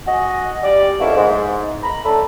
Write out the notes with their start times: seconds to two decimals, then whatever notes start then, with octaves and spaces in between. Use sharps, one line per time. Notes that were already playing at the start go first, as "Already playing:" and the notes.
0.07 F#4 D#5 G#5
0.63 G3 D5
0.99 F2 B2 A#3 C#4 E4
1.16 G#2
1.83 A#5 B5
2.04 A2 A3 D4 A4 A5 B5